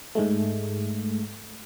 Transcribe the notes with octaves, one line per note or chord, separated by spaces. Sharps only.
G#2 G#3 A3